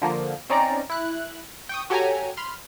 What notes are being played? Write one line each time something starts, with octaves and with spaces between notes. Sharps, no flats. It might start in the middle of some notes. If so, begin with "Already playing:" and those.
D3 F3 A#3
C4 C#4 D#4 D5 A#5
E4 F#6
G5 C#6 D#6
F#4 G4 A4 C#5 G#5 A#5
B5 C6 F6